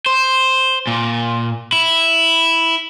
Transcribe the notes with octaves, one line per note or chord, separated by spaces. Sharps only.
C5
A#2
E4